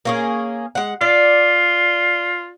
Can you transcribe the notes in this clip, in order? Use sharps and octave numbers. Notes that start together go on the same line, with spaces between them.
A#3 C#4 G#4
G#3 F#5
F4 D5